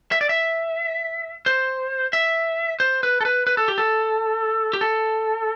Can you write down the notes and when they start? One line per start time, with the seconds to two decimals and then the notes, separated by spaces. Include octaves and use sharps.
0.12 E5
0.21 D5
0.29 E5
1.46 C5
2.13 E5
2.80 C5
3.03 B4
3.21 A4
3.25 B4
3.47 B4
3.57 A4
3.68 G4
3.78 A4
4.73 G4
4.81 A4